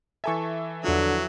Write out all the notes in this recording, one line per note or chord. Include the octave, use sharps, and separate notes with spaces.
E3 A4 E5 G#5 A5 C#6
E2 D3 F3 F#3